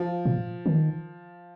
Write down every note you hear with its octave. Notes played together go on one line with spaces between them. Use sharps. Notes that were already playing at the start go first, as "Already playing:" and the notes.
Already playing: F3
A#2
D#3